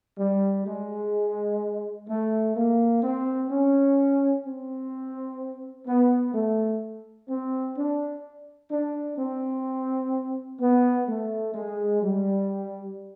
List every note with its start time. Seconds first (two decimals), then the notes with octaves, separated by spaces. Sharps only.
0.19 G3
0.66 G#3
2.08 A3
2.56 A#3
3.03 C4
3.50 C#4
4.45 C4
5.87 B3
6.34 A3
7.28 C4
7.76 D4
8.71 D4
9.18 C4
10.61 B3
11.08 A3
11.55 G#3
12.03 G3